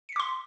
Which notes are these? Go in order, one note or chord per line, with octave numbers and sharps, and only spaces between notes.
C6 D6 B6 C#7